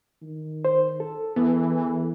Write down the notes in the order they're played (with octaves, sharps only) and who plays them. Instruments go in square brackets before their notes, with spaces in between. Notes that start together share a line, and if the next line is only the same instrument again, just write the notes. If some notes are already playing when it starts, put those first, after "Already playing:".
[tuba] D#3
[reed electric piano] C5
A4
[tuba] E2 [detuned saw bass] E3 [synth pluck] B3